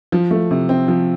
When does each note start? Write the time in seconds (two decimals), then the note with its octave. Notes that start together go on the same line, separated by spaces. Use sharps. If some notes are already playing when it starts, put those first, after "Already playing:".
0.12 F3
0.31 A3
0.51 C3
0.69 C4
0.88 F3